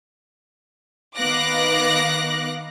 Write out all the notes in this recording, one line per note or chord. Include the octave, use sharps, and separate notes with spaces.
D#3 B3 F5 D6 F#6 A#6